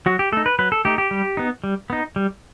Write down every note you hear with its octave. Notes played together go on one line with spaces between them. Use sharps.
F#3 F#4
G4
A3 D#4 A4
B4
F#3 B4
A4
A3 D#4 G4
G4
G3
B3 D#4
G3
B3 D#4
G3